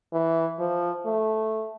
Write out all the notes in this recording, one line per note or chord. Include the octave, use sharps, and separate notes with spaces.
E3
F3
A3